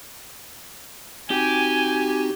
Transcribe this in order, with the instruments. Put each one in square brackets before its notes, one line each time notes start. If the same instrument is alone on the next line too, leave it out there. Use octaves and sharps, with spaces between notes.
[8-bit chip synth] C4 D#4 F#4 [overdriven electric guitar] G4 [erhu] G#5